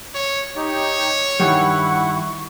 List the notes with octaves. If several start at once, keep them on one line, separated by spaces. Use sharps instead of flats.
C#5
D#4 G4 C#5
G2 D#3 G3 E4 F#5 C#6